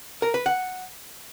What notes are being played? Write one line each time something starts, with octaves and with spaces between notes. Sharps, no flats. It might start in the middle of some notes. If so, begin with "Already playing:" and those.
A#4
B4
F#5